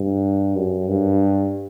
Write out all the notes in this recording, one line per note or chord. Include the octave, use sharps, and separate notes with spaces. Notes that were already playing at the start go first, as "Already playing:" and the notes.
Already playing: G2
F#2
G2